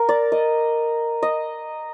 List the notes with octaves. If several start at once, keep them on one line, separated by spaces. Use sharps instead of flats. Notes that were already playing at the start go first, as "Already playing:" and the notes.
Already playing: A#4
D5
D#5
D#5